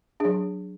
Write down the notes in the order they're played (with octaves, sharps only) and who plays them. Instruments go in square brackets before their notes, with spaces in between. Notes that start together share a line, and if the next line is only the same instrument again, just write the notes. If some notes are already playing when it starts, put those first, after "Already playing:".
[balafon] F#3 D4 G#4